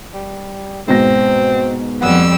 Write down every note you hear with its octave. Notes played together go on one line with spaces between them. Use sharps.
G3
G#2 B2 C4 A#6
F2 G3 B3 E6